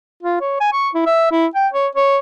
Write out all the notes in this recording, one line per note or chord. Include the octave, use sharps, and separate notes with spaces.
F4
C#5
G#5
C#6
E4
E5
E4
G5
C#5
C#5